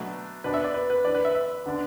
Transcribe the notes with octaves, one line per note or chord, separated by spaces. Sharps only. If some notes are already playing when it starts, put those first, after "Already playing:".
Already playing: B2 F#3 A3 D4
B2 B3 D4 B4
E5
D5
B4
B4
E3 D4 D5
B4
E5
E5
D3 B3 D4